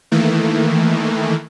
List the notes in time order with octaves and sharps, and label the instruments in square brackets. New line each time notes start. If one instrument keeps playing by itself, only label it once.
[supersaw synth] D#3 E3 A3 A#3